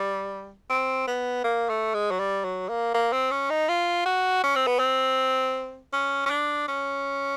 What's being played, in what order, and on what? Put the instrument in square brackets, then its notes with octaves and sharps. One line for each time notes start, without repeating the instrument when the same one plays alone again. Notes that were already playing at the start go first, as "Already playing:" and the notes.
Already playing: [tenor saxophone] G3
C4
B3
A#3
A3
G#3
F#3
G3
F#3
A#3
A#3
C4
C#4
D#4
F4
F#4
C#4
C4
B3
C4
C#4
C#4
D4
C#4